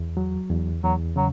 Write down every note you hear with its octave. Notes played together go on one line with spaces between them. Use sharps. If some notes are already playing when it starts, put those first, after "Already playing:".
Already playing: E2
F#3
E2
E2 F#3
C#3 F#3